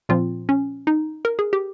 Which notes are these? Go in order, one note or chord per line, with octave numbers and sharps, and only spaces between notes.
A#2 F3 C4 F4
C#4
D#4
A#4
G#4
G4